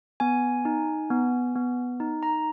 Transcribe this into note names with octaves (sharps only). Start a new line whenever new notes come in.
B3 G#5
D#4
B3
B3
D#4
A#5